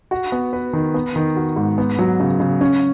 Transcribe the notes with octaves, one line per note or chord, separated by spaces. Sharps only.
F#4
B3
B4
D#3
B3
D#3
F#4
G#2
B3
F#3
C#3
C#3
C#4